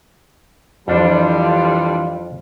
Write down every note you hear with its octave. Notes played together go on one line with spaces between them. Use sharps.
F2 D3 E3 G3 D4 F4 C5